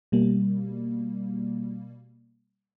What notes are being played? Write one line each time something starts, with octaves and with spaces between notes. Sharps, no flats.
B2 G3 A#3